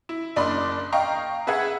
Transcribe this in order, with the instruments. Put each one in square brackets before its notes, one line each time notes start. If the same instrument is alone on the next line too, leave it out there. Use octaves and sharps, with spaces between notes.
[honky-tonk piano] E4
F#1 D4 D5 D#5 B5 C6
D#5 F5 G5 A#5 C#6
G#4 B4 E5 F#5 G#6